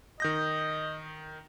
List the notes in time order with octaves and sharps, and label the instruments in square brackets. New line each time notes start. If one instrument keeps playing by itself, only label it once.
[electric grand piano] D#3 G6 A#6 [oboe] D#5